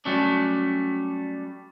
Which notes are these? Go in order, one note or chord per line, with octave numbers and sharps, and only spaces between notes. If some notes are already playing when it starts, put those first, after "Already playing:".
F#3 G3 A3 C#4 D4